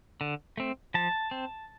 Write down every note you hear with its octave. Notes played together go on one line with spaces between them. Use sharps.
D3
A3 C4
F3 A5
C4